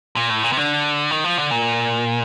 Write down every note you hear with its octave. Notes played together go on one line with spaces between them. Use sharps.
A#2
A2
A#2
C3
D3
D#3
F3
D3
A#2